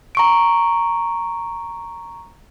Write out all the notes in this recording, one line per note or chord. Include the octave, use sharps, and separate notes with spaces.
A#5 C#6 D7